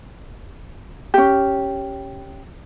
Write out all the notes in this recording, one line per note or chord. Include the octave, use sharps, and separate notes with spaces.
C#4 G4